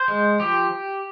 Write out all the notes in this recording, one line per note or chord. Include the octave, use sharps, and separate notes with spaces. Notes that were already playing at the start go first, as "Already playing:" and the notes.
Already playing: C5
G#3
F3 G4